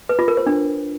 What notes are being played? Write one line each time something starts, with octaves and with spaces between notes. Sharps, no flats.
B4
F4
A#4
C5
D4